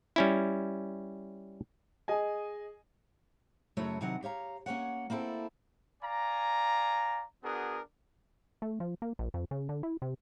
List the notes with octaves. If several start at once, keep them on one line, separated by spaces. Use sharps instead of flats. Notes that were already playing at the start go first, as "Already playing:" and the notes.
G3 C#4 E4
G#4 D#5 G#5
F#2 C#3 A3 E4 F#4 C#5
C3 D#3 F#3 F#5
G4 C#5 F5 A#5
A#3 C#4 C#5 F#5
A#3 C4 E4 A4
D5 F5 G#5 A#5
B3 D4 F#4 G#4 A#4
A3
F3
A#3
A#1
F2
C#3
D3
E4
C3